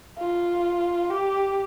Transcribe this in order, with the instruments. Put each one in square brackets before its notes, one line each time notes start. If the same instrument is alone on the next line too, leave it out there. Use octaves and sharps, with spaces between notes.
[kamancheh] F4
G4